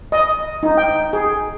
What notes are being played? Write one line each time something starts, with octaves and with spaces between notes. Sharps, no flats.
D#5
D#4
G5
G#4